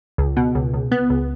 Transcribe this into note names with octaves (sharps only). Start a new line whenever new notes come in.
C#2
B2
C#2
C#2
B3
C#2